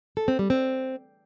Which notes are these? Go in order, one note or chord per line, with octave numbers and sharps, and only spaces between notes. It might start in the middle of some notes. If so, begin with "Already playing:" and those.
A4
C4
G3
C4